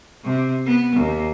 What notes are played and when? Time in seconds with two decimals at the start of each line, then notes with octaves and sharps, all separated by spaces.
0.24 C3
0.66 B3
0.96 D#2